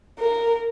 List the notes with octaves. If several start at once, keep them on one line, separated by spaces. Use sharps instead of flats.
A#4